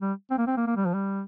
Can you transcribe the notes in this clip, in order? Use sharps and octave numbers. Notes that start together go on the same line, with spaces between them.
G3
C4
A#3
C4
A#3
A#3
G3
F3
G3